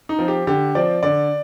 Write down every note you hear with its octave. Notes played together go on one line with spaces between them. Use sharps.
D#4
F3 C4
G4
D3 G4
F3 C4 D5
D3 D5